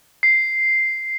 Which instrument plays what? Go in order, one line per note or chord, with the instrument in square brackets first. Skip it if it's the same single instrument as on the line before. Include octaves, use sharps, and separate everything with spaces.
[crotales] C7